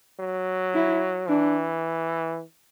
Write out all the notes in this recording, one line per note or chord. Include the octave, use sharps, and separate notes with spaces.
F#3
E4
E3 D4